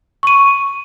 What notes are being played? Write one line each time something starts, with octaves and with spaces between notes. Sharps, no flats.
C#6 D#7